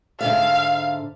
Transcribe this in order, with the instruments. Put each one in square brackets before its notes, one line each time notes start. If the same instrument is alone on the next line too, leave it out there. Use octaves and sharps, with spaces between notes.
[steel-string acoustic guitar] G#2 D3 E5 [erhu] F5